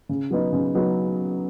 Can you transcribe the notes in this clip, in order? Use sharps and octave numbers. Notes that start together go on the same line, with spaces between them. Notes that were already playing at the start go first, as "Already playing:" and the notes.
C#3
F#3 B3 D#4
C#3
F#3 B3 D#4